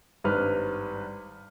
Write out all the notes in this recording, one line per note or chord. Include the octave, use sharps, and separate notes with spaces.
G#1 G2 B4 F6